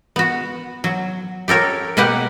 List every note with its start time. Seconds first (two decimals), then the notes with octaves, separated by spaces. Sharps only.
0.16 B3 F#4
0.84 F#3
1.48 G4 A4 A#4 C#5
1.97 B2 A#3 G4 B4 F#5